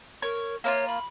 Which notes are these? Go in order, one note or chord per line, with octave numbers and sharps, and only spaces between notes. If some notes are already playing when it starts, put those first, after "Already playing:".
A#4 C#5
A#3 E4 F4 C#5
B5